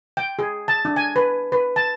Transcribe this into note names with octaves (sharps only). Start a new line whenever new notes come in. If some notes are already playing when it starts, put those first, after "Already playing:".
G5
G#4
A5
D4
G#5
B4
B4
A5